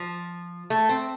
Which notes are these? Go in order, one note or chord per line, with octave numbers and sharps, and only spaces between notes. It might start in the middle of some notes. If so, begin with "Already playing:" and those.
Already playing: F3
A3
C4